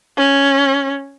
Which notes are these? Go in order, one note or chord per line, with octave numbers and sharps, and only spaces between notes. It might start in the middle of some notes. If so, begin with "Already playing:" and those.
C#4